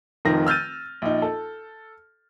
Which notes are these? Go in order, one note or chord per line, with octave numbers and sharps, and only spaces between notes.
F1 C3 D#3 F3 A#6
E6 F6 G6 A6 D#7
A#1 D#4
A4